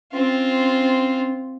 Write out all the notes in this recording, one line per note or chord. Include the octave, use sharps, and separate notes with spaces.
C4 C#4 F4